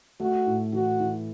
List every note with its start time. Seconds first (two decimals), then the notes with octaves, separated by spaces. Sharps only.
0.20 A3 F#4
0.47 A2
0.73 E3 F#4
1.00 E3